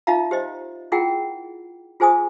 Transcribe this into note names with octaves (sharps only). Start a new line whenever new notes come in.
D#4 F4 E5 F5 A#5
G4 C5 D#5
E4 F4 G#4 A#4 F#5 G5
F4 G#4 C5 G#5 C#6 D#6